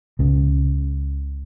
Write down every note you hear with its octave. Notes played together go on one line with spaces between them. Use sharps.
C#2 C#3